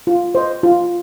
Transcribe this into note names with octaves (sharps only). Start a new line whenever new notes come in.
F4
C5 D#5
F4